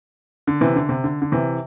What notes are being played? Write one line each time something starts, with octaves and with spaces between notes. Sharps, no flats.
D3
C3 E3
D3
C3
D3
D3
C3 E3